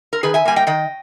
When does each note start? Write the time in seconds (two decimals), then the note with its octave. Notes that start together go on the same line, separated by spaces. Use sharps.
0.13 A#4
0.23 D#3 G#4 B4
0.34 E5 G#5
0.45 G3 A#3 G#5
0.56 D#5 G5
0.67 D#3 D#5 G5